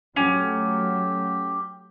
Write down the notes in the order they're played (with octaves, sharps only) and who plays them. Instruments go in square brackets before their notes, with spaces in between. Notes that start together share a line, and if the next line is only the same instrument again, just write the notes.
[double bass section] F#3 A3 [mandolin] C#4 [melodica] G4